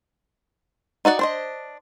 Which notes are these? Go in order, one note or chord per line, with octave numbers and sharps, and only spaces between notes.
D#4 F#4 D5 F#5
D4 C5 D#5